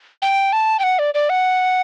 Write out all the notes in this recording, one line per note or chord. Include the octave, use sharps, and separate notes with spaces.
G5
A5
G5
F#5
D5
D5
F#5